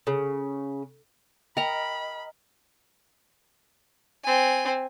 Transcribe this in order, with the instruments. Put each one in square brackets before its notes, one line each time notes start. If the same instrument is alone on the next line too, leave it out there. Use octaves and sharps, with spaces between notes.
[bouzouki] C#3
[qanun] A#4 A#5 [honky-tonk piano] D#5 [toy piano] G5 [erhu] B5
[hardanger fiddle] C4 G#5